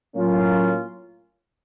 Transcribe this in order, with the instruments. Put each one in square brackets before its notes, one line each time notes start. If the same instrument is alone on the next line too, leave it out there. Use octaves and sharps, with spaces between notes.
[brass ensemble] A2 F#3 A#3 C#4 F4